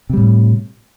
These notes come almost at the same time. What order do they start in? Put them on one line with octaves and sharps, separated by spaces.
C3 G3 A2